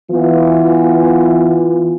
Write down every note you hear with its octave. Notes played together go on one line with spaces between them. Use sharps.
E3 B3 F4